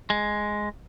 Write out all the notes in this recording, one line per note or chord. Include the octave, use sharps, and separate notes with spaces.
G#3